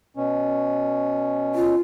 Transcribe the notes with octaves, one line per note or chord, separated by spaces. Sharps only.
B2 C#4
F4